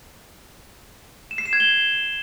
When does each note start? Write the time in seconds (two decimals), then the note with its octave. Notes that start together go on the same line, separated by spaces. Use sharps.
1.31 E7
1.38 C7
1.46 E7
1.53 G#6
1.60 G7